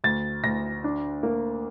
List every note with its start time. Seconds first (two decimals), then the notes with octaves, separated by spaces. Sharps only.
0.04 D2 A6
0.44 D2 A#6
0.84 D4
1.23 A#3